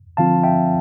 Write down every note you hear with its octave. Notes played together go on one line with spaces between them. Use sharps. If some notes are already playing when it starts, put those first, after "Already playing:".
D3 F3 C4 F4 F5 A5
E5 G5